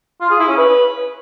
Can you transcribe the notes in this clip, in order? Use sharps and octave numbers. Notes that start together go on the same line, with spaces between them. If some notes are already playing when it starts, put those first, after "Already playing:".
F4
G#4
E4
C#4
B4